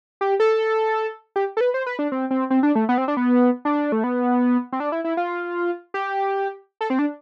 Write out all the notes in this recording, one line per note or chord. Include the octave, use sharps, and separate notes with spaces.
G4
A4
G4
A4
B4
C5
B4
D4
C4
C4
C4
D4
A3
B3
C4
D4
B3
D4
A3
B3
C4
D4
E4
E4
F4
G4
A4
C4
D4